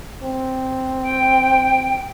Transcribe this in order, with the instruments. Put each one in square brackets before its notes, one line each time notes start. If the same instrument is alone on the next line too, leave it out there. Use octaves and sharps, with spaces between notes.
[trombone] C4
[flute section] G5